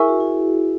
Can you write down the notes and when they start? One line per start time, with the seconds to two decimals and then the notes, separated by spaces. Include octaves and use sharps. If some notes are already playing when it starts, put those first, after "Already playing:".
Already playing: E4 G#4 A#4 E5 G#5 C#6 E6
0.08 F#4
0.20 E4 G#4